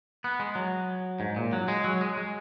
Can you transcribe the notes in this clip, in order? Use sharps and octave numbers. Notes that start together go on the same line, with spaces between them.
B3
G#3
F#3
G#2
A#2
F#3
G#3
F#3
G#3
G#3